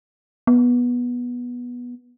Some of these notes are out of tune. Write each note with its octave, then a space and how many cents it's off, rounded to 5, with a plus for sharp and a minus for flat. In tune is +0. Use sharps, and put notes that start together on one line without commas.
B3 -15